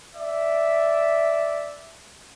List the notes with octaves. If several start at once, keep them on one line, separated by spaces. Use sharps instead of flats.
D5 E5